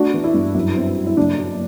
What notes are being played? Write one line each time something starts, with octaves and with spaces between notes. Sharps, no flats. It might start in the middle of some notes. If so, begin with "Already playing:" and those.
Already playing: A3 D4 F#4
E3
E4
G2
F#2
C4
F#3
E4
F#1 D4
F#3